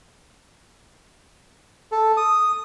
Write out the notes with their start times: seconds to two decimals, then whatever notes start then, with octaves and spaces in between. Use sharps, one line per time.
1.92 A4
2.17 D#6